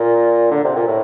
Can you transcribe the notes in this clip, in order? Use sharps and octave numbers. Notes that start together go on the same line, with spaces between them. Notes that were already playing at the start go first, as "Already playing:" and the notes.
Already playing: A#2
D3
C3
A#2
A2